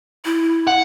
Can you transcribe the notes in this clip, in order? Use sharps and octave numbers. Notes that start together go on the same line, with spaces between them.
E4
F#5